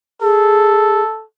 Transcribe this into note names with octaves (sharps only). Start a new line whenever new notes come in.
G#4 A4